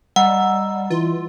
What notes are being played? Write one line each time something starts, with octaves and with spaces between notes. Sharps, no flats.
G3 D#5 F#5 A#5 E6
E3 F4 B4